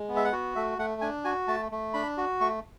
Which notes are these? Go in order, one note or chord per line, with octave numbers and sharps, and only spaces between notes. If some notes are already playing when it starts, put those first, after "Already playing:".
Already playing: G#3
B3
E5
F#5
F#4
A3 E5
A3 F#5
D4 G#5
F#4 G#5
A3 A5
A3
D4 B5
F#4
A3 C#6